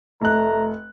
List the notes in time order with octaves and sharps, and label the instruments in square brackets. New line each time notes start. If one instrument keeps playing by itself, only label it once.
[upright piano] F1 F#6 [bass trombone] A3 [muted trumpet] A#5